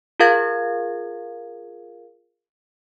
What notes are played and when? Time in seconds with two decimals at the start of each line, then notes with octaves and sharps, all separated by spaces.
0.20 F4 G#4 A#4 F5 G#6